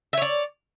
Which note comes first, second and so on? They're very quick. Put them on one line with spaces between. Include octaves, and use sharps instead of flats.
E5 C#5 D5